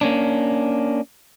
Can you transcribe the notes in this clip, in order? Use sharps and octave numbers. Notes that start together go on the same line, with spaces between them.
A#3 C#4 D4